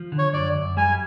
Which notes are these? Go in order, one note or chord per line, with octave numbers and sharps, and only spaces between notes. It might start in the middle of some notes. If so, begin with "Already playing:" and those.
Already playing: F3
D3
C#5
F#2 D5
F#2
G3 G#5